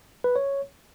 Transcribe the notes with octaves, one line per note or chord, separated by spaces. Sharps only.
B4
C#5